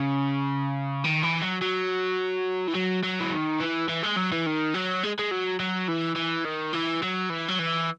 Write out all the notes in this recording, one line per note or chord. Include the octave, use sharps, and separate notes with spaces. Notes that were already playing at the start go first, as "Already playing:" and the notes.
Already playing: C#3
D#3
E3
F#3
F#3
E3
F#3
F#3
E3
D#3
E3
E3
G#3
F#3
E3
D#3
F#3
G#3
G#3
F#3
F#3
E3
E3
D#3
E3
F#3
E3
F#3
E3